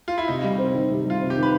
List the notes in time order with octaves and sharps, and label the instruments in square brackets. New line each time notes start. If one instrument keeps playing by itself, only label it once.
[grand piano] F4
E4
[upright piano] C3 [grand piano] D#4
[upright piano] G3
C4
D#3
C3
[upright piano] G3 [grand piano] F4
[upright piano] C4
[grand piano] G4
[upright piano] D#3
[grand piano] B4